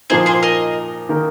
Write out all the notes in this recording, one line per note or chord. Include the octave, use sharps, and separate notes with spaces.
A#2 F3 A#3 D#4 G#4 C5
G#4 C5
A#4 D#5
D#3 A#3 D#4 A#4